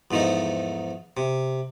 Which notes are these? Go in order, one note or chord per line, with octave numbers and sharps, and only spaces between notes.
E2 G#2 F3 A3 D#4
C3